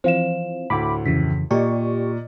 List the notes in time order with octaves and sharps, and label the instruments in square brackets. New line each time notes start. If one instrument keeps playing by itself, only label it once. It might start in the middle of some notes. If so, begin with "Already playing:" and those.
[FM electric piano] E3 F3 C4 [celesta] C5 F5 E7
[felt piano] D2 A2 [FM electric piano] B5 D6
[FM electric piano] F2 C#3 E3 [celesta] B6
[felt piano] A#2 [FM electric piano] G4 C#6 [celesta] D5 D#5